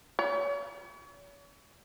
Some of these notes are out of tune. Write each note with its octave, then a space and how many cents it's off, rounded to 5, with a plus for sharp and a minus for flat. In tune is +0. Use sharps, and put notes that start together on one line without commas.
C#5 +40